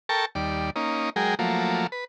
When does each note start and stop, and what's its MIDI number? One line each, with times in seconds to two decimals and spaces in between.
0.09 0.25 69
0.09 0.25 70
0.09 0.25 79
0.09 0.25 81
0.09 0.25 85
0.35 0.70 39
0.35 0.70 55
0.35 0.70 74
0.76 1.10 58
0.76 1.10 61
0.76 1.10 63
1.16 1.35 54
1.16 1.35 56
1.16 1.35 68
1.16 1.35 70
1.16 1.35 79
1.39 1.87 53
1.39 1.87 54
1.39 1.87 57
1.39 1.87 58
1.92 2.04 71